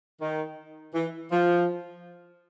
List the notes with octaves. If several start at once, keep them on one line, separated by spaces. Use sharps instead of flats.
D#3
E3
F3